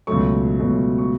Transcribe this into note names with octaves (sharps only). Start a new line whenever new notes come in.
C#2 B2 F#3 A3 C#6
C#2 B2 F#3 A3
C#6